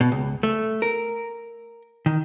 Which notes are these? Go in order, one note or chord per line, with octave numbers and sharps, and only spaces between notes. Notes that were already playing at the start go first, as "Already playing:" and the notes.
B2
C#2
A3
A#4
D#3